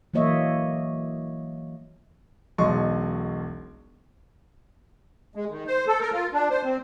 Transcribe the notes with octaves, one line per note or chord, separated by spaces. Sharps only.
E3 F#3 A#3 C#5 D#5 E5
E1 B1 B2 D#5 C6 C#6
G#3
D#3
C5
A4
A#4
F4
D4
C5
C4